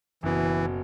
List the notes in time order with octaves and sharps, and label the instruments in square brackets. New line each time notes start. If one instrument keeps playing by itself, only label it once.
[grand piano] F#1 B2 [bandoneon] E3